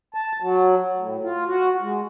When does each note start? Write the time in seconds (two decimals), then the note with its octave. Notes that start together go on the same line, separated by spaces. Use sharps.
0.14 A5
0.40 F#3
0.96 A2
1.22 F4
1.46 F#4
1.81 G#3